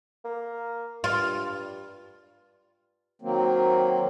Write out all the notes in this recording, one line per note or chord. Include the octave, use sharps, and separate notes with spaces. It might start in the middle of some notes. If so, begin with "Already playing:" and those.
A#3
G2 F4
D#3 F#3 A#3 C4